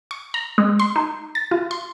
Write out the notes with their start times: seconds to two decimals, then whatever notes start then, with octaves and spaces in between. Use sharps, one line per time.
0.11 C#6
0.34 A#5
0.58 G#3
0.79 C6
0.96 D#4
1.35 A6
1.51 F4
1.71 C6